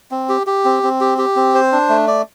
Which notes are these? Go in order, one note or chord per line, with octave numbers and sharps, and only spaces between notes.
C4
G4
G4
C4
C4
G4
G4
C4
C5
D4
A3
D5